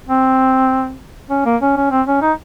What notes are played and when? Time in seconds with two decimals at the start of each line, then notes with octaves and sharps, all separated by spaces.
0.07 C4
1.29 C#4
1.45 A#3
1.61 C#4
1.77 C#4
1.91 C4
2.07 C#4
2.22 D#4